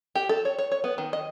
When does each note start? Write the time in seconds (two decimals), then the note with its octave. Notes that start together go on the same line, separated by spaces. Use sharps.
0.15 G4
0.29 A4
0.45 C#5
0.59 C#5
0.72 C#5
0.84 B3
0.98 D#3
1.13 D#5